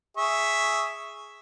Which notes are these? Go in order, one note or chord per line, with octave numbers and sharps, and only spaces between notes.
G#4 E5 C#6